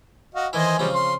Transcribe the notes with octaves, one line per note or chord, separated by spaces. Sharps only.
F#4 D#5 F5
D#3 E3 E4 C5 D#5 G#5
C#3 F3 G3 G#3 C4
C6